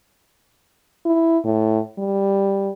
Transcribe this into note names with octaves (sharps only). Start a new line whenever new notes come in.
E4
A2
G3